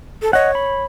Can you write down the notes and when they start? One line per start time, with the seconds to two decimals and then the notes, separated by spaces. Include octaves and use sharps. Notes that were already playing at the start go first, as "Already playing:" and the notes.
0.22 A4
0.33 C#5 D#5 F#5
0.55 B5